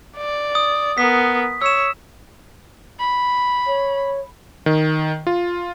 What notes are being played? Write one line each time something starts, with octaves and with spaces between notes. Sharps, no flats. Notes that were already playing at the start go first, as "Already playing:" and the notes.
D5
D#6
B3 A#4 B6
C#5 E6 E7
B5
C#5
D#3
F4